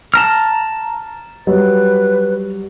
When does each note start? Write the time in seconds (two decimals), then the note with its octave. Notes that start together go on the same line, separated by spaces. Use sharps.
0.14 A5 A#5 F6
1.47 F#3 G3 B4